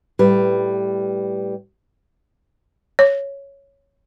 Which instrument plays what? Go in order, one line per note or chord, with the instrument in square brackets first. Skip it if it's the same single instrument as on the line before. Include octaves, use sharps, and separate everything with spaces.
[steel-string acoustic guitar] A2 G3 B4
[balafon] C#5